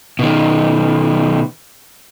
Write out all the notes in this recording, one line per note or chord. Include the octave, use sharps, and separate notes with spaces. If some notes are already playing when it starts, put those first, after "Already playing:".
B2 D#3